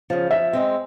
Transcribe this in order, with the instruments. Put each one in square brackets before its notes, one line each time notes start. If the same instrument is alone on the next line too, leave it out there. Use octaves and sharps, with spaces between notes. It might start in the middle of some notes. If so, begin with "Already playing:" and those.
[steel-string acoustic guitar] C#3 F3
[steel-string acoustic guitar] F3 [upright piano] E5
[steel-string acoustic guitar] G#3 C4